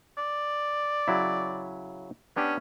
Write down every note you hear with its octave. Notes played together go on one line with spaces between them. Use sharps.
D5
C#3 F#3 E4
B3 C#4 D4 G4